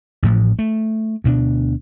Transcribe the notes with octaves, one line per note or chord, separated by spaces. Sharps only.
A1 A2 F3
A3
D2 B2 B3 D4